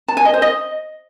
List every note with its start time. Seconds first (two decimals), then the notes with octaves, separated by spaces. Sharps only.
0.08 A5
0.17 G#5
0.25 D#5
0.34 C5
0.42 D#5